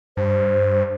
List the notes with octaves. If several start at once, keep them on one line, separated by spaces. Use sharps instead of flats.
G2 C5